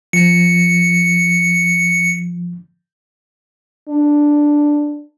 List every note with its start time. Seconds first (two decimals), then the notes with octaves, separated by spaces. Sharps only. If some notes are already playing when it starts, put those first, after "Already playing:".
0.13 F3 C#7
3.89 D4